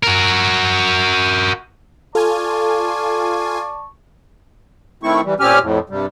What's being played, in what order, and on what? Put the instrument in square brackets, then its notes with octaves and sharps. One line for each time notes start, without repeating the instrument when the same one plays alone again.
[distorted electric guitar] F#4 A#4
[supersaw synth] F4 G#5 [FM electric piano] A4 [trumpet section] D5 A5 C#6
[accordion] D#3 A3 C4 E4 C#6
E3 G3
A#2 C4 C#4 G4 G#5 F6
F2 A2
G2 C3 G3